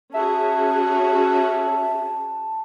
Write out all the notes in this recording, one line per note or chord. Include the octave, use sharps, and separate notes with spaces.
C#4 F#4 G#4 E5 A5